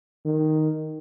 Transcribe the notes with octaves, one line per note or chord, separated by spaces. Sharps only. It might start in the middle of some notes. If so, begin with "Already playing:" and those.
D#3